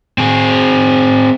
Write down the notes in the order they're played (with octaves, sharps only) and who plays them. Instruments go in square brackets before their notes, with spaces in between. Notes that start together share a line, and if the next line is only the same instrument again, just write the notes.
[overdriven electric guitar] C4 G#4